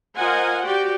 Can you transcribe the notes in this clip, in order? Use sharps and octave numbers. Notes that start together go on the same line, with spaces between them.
F4 A#4 C5 D#5 F#5 G#5
F#4 G4 D5 G5